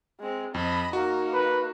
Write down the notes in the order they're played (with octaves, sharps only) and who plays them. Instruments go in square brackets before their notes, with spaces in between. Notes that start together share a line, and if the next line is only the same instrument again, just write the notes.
[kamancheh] G#3 C4
[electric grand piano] F2 [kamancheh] D#5 B5
[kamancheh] A#3 D#4 [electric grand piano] F#4
[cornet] B4